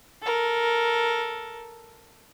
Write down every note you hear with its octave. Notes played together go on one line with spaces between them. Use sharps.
A4 A#4